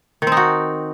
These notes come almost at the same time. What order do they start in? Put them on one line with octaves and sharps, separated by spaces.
D#3 C4 D#4 F#4